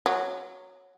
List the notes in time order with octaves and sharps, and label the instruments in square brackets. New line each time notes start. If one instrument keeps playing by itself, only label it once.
[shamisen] F#3